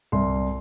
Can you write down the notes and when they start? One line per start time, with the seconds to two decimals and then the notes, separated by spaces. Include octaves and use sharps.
0.12 C2 C6